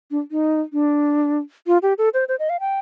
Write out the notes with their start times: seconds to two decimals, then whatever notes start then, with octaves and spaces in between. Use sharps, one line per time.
0.11 D4
0.31 D#4
0.73 D4
1.67 F4
1.82 G4
1.98 A4
2.14 C5
2.28 C5
2.39 D#5
2.50 F5
2.60 G5